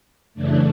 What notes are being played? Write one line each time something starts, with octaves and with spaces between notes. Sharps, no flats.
F#2 C#3 E3 A3 D4